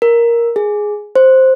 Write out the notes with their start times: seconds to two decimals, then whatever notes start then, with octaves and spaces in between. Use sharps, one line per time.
0.02 A#4
0.56 G#4
1.16 C5